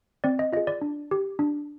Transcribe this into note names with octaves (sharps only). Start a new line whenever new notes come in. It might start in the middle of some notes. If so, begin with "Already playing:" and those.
C4 D5
D#5
F4 G#4 D#5
D5
D4
G4
D4